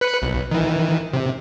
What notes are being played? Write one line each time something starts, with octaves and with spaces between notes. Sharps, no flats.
B4 F#6 C#7
B1
D#3 E3
C3